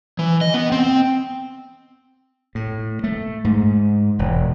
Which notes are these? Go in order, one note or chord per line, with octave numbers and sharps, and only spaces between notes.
E3
D#5
B3
C4
A2
A3
G#2
E1